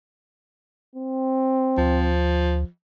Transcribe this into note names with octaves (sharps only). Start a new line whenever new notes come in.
C4
D2 F3